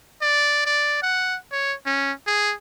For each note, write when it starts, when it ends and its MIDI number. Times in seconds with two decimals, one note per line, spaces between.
0.22 0.63 74
0.66 1.00 74
1.02 1.37 78
1.52 1.74 73
1.86 2.12 61
2.27 2.54 68